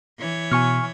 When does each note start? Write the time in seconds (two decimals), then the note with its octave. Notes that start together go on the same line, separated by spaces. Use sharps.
0.19 E3 C#5
0.52 B2 G#5 C#6 F6